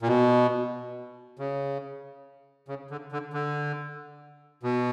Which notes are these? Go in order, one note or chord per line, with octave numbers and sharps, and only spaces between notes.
A#2
B2
C#3
C#3
D3
D3
D3
B2